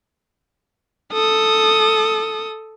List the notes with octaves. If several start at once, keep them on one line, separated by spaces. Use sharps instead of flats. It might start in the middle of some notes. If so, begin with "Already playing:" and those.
A4 D#6